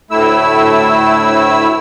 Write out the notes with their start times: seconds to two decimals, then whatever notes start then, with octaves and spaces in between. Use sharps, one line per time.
0.11 D2 A2 A3 E4 E6